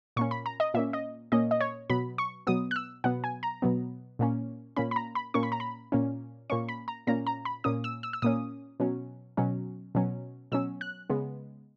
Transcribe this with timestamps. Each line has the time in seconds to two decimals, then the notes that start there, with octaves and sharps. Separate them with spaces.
0.16 A#2 A#3 C#4 C#6
0.31 B5
0.46 A#5
0.60 D#5
0.74 A#2 A#3 C#4 E5
0.93 D#5
1.32 A#2 A#3 C#4 D#5
1.51 D#5
1.61 C#5
1.90 B2 F#3 B3 B5
2.18 C#6
2.47 B2 F#3 B3 D#6
2.71 F#6
2.76 E6
3.04 B2 F#3 B3 F#5
3.24 G#5
3.43 A#5
3.62 B2 F#3 B3
4.19 A#2 A#3 C#4
4.76 A#2 A#3 C#4 B5
4.91 B5
4.96 A#5
5.15 B5
5.34 A#2 A#3 C#4 C#6
5.43 B5
5.52 A#5
5.60 B5
5.92 A#2 A#3 C#4
6.50 A#2 A#3 C#4 C#6
6.69 B5
6.88 A#5
7.07 A#2 A#3 C#4 A#5
7.27 A#5
7.45 B5
7.64 A#2 A#3 C#4 D#6
7.84 E6
8.03 E6
8.13 E6
8.22 A#2 A#3 C#4 D#6
8.80 B2 F#3 C#4
9.37 B2 F#3 C#4
9.95 B2 F#3 C#4
10.52 B2 F#3 C#4 E6
10.81 F#6
11.10 C#3 G#3 B3